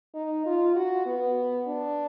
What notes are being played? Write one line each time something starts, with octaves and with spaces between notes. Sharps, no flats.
D#4
F4
F#4
B3
D4